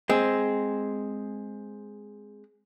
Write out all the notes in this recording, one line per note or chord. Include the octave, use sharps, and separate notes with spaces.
G#3 C4